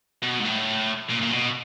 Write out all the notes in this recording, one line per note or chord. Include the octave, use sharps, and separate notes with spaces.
B2
G#2
A2
A#2
A#2
B2